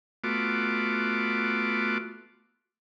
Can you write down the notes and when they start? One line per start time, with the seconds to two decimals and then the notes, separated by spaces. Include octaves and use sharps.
0.24 A3 B3 F4 F#4 D6